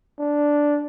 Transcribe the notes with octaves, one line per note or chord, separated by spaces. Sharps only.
D4